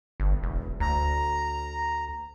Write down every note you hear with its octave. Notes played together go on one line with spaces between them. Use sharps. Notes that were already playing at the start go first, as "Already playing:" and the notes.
G1
E1
D2 A#5